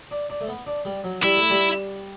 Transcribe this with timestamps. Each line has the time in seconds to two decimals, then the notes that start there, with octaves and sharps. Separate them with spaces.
0.11 D4
0.30 D4
0.41 A3
0.48 B3
0.67 D4
0.85 G3
1.04 F#3
1.23 G3 E4
1.37 A3
1.50 G3